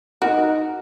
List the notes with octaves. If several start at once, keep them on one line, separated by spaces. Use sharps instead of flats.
D#4 F#4 A#4